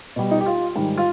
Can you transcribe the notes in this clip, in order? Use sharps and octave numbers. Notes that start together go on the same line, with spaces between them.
B2 G3
D#4
G4
F4
G#2 D#3 G3
F4